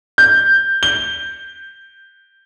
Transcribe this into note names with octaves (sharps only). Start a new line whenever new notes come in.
G6
G7